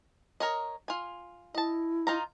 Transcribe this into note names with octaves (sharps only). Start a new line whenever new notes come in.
A#4 C#5 D#5
F4 G#5
E4 D#5 A5
D#4 F4 A#5